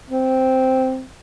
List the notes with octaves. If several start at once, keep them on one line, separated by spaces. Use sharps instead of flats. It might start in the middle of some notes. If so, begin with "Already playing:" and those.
C4